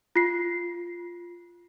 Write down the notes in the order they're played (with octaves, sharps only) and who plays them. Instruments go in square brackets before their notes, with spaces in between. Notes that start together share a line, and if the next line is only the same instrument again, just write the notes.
[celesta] F4 C7